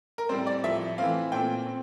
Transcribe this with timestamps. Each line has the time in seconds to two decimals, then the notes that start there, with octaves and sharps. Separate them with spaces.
0.18 A#4
0.29 A2 G3 C4 C5
0.46 D5
0.64 A2 F3 A3 E5
0.98 E3 A3 C4 F5
1.32 A#2 A3 C4 G5
1.67 C4